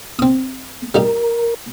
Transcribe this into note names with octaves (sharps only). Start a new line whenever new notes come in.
C4 D#6
G3 D#4 G4 A#4